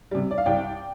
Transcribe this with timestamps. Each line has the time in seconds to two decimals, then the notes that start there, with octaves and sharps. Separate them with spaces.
0.11 C3 G3
0.31 D5
0.38 F5
0.46 C2 D5 G5